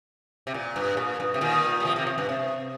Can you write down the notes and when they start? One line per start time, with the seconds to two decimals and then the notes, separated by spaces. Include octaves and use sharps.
0.47 C3
0.54 A#2
0.76 G2
0.97 A#2
1.20 G2
1.34 C3
1.41 A#2 D#3
1.80 G3
1.85 C3 F3
1.96 C3 F3
2.07 C3
2.18 G2
2.29 C3